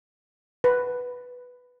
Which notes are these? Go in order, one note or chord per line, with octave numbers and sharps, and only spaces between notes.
B4